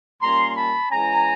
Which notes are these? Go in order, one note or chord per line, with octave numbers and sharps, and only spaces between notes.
A#2 G3 A#3 C#4 A#5 C6
A5 B5
E3 G#3 C#4 G#5 A#5